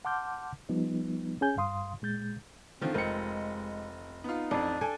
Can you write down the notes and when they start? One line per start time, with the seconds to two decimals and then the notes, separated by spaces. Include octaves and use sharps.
0.05 F#5 A5 C6 D6 F6 G6
0.69 F3 G3 B3 D#4
1.41 C#4 G#4 G#5 G6
1.57 G2 F5 C6 D#6
2.02 A#2 G#3 G6 A6
2.82 D3 D#3 F3 C4 F4
2.94 F1 G#3 C4 A#4 C#7
4.24 B3 D#4 F4
4.51 A1 F2 D4 A4
4.81 A4 G5 G#5